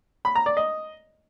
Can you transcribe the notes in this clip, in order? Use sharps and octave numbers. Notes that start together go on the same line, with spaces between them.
B5
A#5
D5
D#5